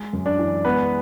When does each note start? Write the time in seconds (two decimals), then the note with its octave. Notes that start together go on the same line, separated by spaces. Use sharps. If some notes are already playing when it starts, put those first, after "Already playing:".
Already playing: G#3
0.13 F#2
0.26 D4 D5
0.39 E3
0.65 G#3 B3 B4